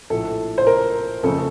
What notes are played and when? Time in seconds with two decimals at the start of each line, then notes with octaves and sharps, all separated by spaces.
0.10 A#1 A2 A4
0.58 C5
0.67 A#4
1.23 F#1 F2 C#3 A4